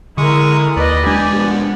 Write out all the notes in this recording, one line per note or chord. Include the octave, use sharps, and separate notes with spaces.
D3 G#3 E4 A#4 C#6 D#6
D#2 B4 D5 D#5
G#3 D4 G4 G#5
F3 B3